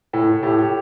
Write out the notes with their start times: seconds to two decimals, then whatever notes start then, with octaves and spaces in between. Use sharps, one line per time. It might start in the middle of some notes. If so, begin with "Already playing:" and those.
0.13 A2
0.43 A2 G4
0.59 G4